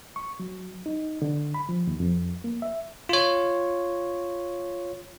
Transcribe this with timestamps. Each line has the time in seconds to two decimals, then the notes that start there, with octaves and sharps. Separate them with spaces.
0.16 C#6
0.40 F#3
0.86 D#4
1.22 D3
1.54 B5
1.69 F3
1.87 D#2
2.00 F2
2.44 A#3
2.62 E5
3.09 F4 C#5